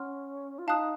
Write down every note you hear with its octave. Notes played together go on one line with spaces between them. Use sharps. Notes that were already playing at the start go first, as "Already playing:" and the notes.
Already playing: C#4 F#5 C6 F6
F4
D#4 F5 A5 D#6 F#6